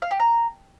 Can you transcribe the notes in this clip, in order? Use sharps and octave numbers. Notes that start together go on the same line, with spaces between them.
F5
G4
A#5